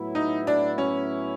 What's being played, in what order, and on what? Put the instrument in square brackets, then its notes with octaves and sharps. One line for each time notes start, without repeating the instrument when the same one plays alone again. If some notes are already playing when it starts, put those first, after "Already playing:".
Already playing: [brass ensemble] A2 F#3 B3 E4
[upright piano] D#4
D4
C#4